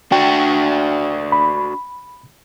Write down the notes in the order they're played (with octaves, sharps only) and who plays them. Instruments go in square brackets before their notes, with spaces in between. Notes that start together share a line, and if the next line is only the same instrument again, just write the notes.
[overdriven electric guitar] D4 F#4 [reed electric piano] G5
[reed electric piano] B5